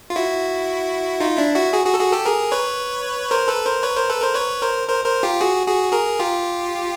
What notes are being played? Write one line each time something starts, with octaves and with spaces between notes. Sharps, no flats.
F4
E4 F#4
D#4 F4
D4 E4
E4 F#4
F#4 G#4
F#4 G#4
A4
F#4 G#4
G4 A4
G#4 A#4
B4 C#5
A#4 C5
A4 B4
A#4 C5
B4 C#5
A#4 C5
A4 B4
A#4 C5
B4 C#5
A#4 C5
A#4 C5
A#4 C5
F4 G4
F#4 G#4
F#4 G#4
G#4 A#4
F4 G4